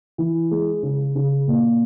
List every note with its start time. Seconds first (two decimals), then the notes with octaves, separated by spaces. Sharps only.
0.18 E3
0.51 G#3
0.83 C#3
1.15 C#3
1.48 A#2